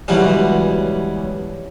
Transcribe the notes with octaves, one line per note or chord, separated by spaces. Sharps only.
C#2 B2 E3 F#3 G3 C#4